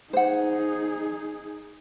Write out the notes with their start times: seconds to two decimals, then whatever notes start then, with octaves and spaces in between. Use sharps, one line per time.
0.13 D#4 G#4 C5 F#5